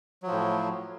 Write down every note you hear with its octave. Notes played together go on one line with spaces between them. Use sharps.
A2 F3 F#3